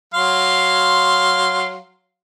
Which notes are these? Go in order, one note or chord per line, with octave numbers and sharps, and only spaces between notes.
F#3 F5 C6